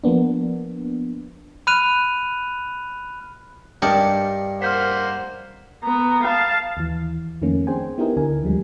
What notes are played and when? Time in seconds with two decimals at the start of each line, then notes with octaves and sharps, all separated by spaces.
0.04 F3 A#3 B3 D4
1.67 B5 F6 F#6 D#7 F7
3.82 G2 D4 D#4 G4 A#4 G5 D6 C#7
4.62 A#3 C5 F#5 F6 G6 B6
5.83 B3 A#5
6.24 F5 A5
6.77 D#2 E3
7.42 F2 D#3 A3 A#3 C#4
7.67 C4 D4 G#4 C5 G5 G#5
7.98 B3 D#4 E4 G4 A#4 D#5
8.17 D2 D3 A#4 G#5
8.42 D#2 F3 G3 G#3